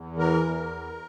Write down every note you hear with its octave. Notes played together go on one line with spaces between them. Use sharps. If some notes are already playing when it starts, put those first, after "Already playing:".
Already playing: E2
E3 A#4
E2